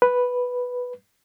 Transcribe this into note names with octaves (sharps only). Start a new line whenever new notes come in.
B4